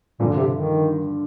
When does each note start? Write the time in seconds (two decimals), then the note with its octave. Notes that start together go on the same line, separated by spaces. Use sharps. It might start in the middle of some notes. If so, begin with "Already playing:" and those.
0.19 G2 A#2 D3 F3
0.37 C3
0.53 D#3